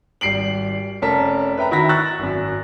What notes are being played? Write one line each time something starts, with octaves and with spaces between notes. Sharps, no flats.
G#1 G3 C7 D7 F#7
F1 C#4 A#4 A5 B6
B4 E5 G5 A#5
D#3 E4 F#4 B5 A#6 B6
C#6 E6 F#6 A6 A#6
G#1 F#2